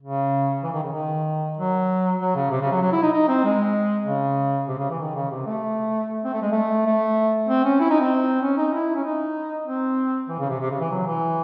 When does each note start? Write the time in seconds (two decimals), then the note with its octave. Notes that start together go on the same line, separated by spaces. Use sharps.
0.02 C#3
0.64 E3
0.73 D#3
0.83 C#3
0.93 D#3
1.57 F#3
2.20 F#3
2.35 C#3
2.51 C3
2.61 C#3
2.71 F#3
2.82 F#3
2.92 E4
3.02 D#4
3.13 D#4
3.28 C4
3.44 G#3
4.07 C#3
4.68 C3
4.79 C#3
4.90 E3
4.99 D#3
5.16 C#3
5.31 C3
5.46 A3
6.24 C4
6.33 A3
6.42 G#3
6.52 A3
6.86 A3
7.49 C4
7.64 C#4
7.80 E4
7.90 D#4
8.00 C4
8.42 C#4
8.57 D#4
8.73 E4
8.95 C#4
9.04 D#4
9.67 C4
10.29 E3
10.39 C#3
10.49 C3
10.60 C3
10.70 C#3
10.80 E3
10.91 F#3
11.06 E3